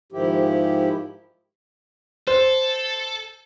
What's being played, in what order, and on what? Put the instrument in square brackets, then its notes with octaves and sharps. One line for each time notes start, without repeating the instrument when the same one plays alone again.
[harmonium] G#2 D#3 F3 E4 G4
[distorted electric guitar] A4 [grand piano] C5